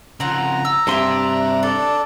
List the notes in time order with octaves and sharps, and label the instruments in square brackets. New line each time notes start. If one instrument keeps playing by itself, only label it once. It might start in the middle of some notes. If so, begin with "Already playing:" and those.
[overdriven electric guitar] C#3 F3 [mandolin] C4 F#5 [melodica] A#5
[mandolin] E6
[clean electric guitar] G2 C3 C6 [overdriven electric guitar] D4 [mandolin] G4 E5 G#5
[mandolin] A4 [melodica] D5